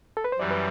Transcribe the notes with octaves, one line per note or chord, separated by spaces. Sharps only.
A4
B4
C5
F#2 E3 G3 D5
B4